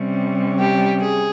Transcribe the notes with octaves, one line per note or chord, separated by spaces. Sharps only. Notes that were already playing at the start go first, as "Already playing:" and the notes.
Already playing: C3 G3 C#4
G4
G#4